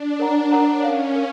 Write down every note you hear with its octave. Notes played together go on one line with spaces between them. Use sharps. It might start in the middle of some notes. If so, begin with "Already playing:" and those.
Already playing: D4
A#4 C#5 F#5 A#5
D4 A#4 C#5 F#5 A#5
C#4 A#4 C#5 F5
A#4 C#5 F5